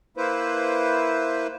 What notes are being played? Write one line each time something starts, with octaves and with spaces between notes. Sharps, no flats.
A#3 E4 B4 C5